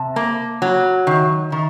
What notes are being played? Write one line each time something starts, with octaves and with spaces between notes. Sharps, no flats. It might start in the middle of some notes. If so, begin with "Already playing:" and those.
Already playing: C3 A5
A#3
F#3
D#3
D#3